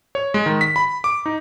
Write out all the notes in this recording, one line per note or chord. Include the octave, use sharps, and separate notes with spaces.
C#5
G#3
D#3
B6
B5
D6
D#4